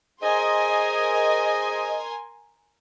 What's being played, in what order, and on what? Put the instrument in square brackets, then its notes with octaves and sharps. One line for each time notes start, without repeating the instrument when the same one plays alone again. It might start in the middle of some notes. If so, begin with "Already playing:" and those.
[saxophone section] G#4 C5 D#5 [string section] A#4 G#5 C6